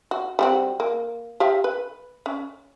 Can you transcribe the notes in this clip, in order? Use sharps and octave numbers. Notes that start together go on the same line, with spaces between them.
F#4
G3 C4 F#4
A#3
G4 E5 F5
B4
C#4